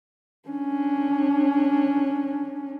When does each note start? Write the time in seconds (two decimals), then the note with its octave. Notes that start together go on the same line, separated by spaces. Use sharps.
0.49 C#4 D4